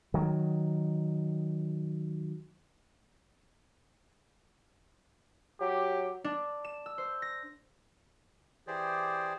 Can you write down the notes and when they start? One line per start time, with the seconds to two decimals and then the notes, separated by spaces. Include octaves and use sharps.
0.14 D#3 F#3
5.61 F#3 G4
6.24 D4
6.64 E7
6.86 E6
6.98 C5
7.22 A#6
8.67 E3 G4 G#4 C5 D5